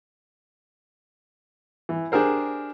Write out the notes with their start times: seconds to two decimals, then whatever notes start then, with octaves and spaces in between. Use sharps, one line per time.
1.89 E3
2.12 D4 G4 G#4 A#4 C5